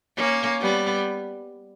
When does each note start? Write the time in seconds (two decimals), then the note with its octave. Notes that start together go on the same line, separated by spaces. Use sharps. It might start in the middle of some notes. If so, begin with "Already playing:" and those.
0.17 A#3 C#4
0.61 G3 B3